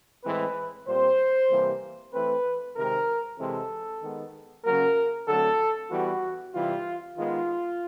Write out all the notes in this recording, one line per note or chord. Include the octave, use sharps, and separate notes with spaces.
A2 E3 G#3 C4 B4
A#2 G3 C4 C5
C3 E3 G3 A#3
E3 A3 C4 B4
C3 D#3 G#3 C4 A#4
C3 E3 G#3 C4 A4
D#3 G#3 B3
C#3 F#3 A#3 A#4
D3 F#3 A3 C4 A4
E3 G3 B3 F#4
C3 E3 G3 F4
D#3 G#3 B3 F4